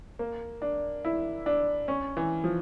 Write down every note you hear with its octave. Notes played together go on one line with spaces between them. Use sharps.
A#3
D4
E4
D4
C#4
E3
F3